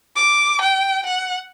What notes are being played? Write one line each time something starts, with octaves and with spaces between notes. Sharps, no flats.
D6
G5
F#5